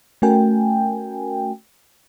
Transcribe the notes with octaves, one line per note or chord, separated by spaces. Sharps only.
A3 C#4 F#4 A#4 G5 G#5